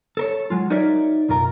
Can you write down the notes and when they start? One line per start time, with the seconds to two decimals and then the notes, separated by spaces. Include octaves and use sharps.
0.17 A4 A#4 C#5
0.50 F#3 G#3 F4
0.70 D#4 F#4 A#4 C#5 D5 E5
1.29 B1 F#2 F4 A#4 A#5